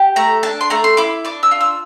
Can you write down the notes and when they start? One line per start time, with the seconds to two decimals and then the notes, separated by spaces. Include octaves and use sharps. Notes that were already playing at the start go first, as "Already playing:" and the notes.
Already playing: G4
0.16 A3 A#5
0.43 D4 A5
0.61 C6
0.70 A3 A#5
0.84 C6
0.97 E4 D6
1.25 D4 D6
1.43 E6
1.51 F4
1.61 E6